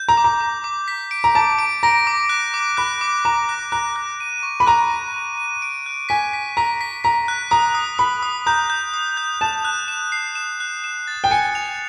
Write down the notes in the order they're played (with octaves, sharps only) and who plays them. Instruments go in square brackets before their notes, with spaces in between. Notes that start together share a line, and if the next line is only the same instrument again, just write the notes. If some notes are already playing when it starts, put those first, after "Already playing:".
Already playing: [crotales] G6
[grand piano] A#5
[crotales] D6
[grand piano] A#5
[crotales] D6
D6
B6
D7
[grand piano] A#5
[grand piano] A5 [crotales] D6
[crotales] D7
[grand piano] A#5 [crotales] A#6
[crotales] D6
F#6
D6
[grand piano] B5 [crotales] F#6
[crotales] D6
[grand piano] A#5 [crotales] D6
[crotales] F#6
[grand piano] A#5 [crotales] F#6
[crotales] F#6
D#7
C#6
[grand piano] B5
[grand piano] A#5 [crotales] F#6
[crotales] D#7
D#7
D#7
D7
F#6
[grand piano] G#5 [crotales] B6
[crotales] B6
[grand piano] A#5 [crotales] B6
[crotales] B6
[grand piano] A#5 [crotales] B6
[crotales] F#6
[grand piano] A#5 [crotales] D#6
[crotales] D#6
[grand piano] B5 [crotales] D#6
[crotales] D#6
[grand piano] A#5 [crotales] G6
[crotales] G6
D#6
G6
[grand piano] A5 [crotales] E7
[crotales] F#6
E7
C7
E7
F#6
E7
A6
[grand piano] G5
[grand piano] G#5 [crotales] C#7
[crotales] F7